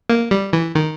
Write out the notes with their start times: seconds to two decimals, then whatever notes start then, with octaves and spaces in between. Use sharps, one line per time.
0.09 A#3
0.31 G3
0.53 E3
0.75 D#3